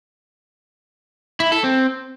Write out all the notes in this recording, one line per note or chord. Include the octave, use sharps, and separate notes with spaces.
E4
A4
C4